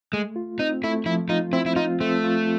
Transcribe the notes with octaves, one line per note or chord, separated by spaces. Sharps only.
G#3 A3
F4
C4 D#4
A3 E4
F3 E4
D#4 F4
C4 E4
E4
D#4 F4
A3 C4
F4